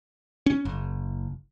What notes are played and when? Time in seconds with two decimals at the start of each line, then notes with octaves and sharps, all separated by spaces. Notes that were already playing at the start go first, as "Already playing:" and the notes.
0.46 C#4
0.65 F#1